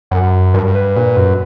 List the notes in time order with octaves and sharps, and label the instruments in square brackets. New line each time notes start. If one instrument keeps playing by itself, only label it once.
[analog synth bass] F#2 [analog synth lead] F#5
[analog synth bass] G2 [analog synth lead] A#4
[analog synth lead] B4
[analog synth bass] A#2
F#2